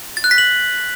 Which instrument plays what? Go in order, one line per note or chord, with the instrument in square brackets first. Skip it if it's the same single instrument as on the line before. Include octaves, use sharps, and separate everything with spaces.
[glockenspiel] A6
F#6
B6
F#7